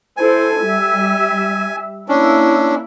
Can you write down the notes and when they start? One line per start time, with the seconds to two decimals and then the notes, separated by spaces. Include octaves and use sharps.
0.17 E4 A4 C5 G#5
0.63 G3 E5
2.08 A#3 C#4 D4 E4